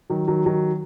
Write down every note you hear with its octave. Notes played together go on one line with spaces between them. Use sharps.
D#3 F#3
D#3 F#3
D#3 F#3